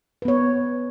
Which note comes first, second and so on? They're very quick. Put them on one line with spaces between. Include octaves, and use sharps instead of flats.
B4 B3 C#5